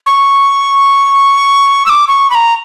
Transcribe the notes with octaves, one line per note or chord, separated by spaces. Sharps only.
C#6
E6
D6
C#6
B5
A#5